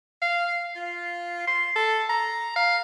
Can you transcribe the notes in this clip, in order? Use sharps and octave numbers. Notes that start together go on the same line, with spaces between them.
F5
F4
C6
A4
A#5
F5